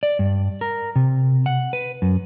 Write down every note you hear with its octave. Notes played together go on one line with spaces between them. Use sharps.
D5
G2
A#4
C3
F#5
B4
F#2